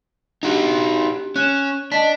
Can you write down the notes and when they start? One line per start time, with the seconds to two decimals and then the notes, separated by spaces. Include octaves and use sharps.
0.43 D4 D#4 F#4 G4
1.36 C#4 F#6 E7
1.92 D4 D#5 A5 B6